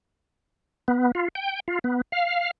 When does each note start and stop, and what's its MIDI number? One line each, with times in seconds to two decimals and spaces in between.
0.88 1.11 59
1.15 1.28 65
1.35 1.60 79
1.68 1.79 65
1.84 2.01 59
2.12 2.51 77